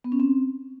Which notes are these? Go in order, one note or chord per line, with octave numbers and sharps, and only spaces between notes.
B3
C#4
C4